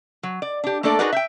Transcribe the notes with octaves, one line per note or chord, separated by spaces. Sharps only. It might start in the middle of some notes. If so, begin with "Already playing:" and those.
F#3
D5
D4 G4
A3 A#3 D4 A4 D5
D#4 F#4 G#4 A#4 B4 D5
E5 G5